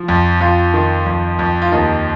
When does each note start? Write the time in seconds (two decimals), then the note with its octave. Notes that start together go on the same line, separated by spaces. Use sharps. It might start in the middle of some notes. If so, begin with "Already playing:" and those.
Already playing: F3
0.08 F2
0.41 F2 F4
0.74 D#3
1.06 F2
1.39 F2
1.62 F4
1.72 D#2 D#4